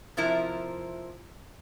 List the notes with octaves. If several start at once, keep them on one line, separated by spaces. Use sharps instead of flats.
C3 F3 E4 A#4